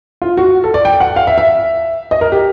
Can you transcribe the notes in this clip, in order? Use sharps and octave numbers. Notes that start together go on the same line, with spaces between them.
F4
F#4
A4
D5
G5
F#5
F5
E5
E5
D#5
A#4
G4